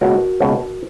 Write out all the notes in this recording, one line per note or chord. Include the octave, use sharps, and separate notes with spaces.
C#2 B2 A#3 C#4 F#4 A#4
C#2 B2 A#3 C#4